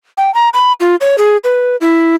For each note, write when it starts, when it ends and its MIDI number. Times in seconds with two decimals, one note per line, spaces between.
0.17 0.33 79
0.34 0.49 82
0.54 0.72 83
0.80 0.96 65
1.01 1.16 73
1.18 1.37 68
1.44 1.76 71
1.81 2.16 64